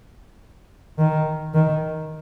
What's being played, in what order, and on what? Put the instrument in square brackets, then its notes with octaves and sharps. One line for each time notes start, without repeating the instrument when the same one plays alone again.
[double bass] D#3
D#3